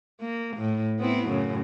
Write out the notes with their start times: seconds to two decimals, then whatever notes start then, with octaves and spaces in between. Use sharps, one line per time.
0.21 A#3
0.57 A2
1.00 B3 C4 E4
1.28 F#2 A2 C#3